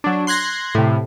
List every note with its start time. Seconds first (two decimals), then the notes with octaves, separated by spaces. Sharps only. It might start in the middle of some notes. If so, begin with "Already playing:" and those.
0.04 F#3 D4
0.27 C6 F#6 G#6 A#6
0.75 A2 C3